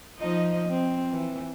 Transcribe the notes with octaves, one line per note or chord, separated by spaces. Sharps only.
F3 D#4 D#5
C4
E3